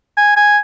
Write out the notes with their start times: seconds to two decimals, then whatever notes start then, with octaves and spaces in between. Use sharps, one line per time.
0.17 G#5
0.37 G#5